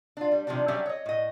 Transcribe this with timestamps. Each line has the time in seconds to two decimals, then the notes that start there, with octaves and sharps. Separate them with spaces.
0.17 D4 F4
0.32 G3
0.47 C3 D#3 F3 G3 D4
0.68 F#3 G3 C#4 G4 D5 E5
0.86 C#5 D#5
1.06 A2 D#5